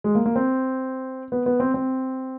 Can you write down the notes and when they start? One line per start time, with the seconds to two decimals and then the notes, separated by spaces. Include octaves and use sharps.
0.04 G#3
0.15 A#3
0.26 A#3
0.36 C4
1.32 B3
1.46 B3
1.60 C4
1.74 C4